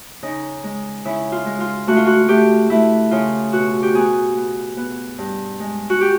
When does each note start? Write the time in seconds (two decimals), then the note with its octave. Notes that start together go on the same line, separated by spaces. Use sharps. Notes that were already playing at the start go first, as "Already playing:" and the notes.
0.23 C#3 D#4
0.64 G#3
1.05 C#3 E4
1.32 F4
1.46 G#3
1.60 F4
1.87 A3 F#4
1.97 F4
2.07 F#4
2.29 A3 G4
2.70 A3 E4
3.11 C#3 F4
3.53 B2 F#4
3.82 G4
3.94 B3 G#4
4.36 B3
4.77 B3
5.18 G2
5.60 G#3
5.90 F#4
6.01 G4